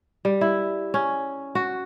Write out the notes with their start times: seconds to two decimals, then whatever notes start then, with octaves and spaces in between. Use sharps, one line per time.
0.25 G3
0.41 E4
0.94 C#4
1.55 F#4